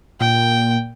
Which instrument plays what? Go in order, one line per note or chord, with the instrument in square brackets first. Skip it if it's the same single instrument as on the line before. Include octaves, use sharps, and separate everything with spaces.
[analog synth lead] A#2 [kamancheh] G5